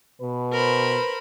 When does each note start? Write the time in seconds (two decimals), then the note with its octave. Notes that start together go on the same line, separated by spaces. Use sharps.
0.21 B2 B4
0.53 A#4 C5 B5